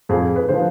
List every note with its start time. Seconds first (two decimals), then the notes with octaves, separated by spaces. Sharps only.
0.09 F2 G#4
0.36 B4
0.49 D3 F3 C5